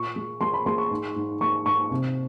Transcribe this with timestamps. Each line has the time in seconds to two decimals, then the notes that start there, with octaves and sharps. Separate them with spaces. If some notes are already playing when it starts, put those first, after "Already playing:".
Already playing: A#2 C#6
0.16 G#3
0.41 G#3 C6
0.54 B5
0.66 G#3 C6
0.78 C#6
0.91 G#2
1.16 G#2
1.41 G#3 C#6
1.66 G#2 C#6
1.91 C3